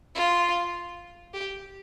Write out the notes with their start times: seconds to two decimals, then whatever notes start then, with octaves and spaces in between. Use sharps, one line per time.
0.15 F4
1.34 G4